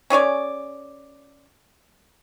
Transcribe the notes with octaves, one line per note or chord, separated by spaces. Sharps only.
C#4 G#4 C#5 D5